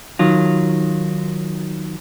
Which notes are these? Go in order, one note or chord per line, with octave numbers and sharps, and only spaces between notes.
D#3 F#3 F4